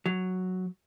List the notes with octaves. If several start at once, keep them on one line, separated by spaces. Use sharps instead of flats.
F#3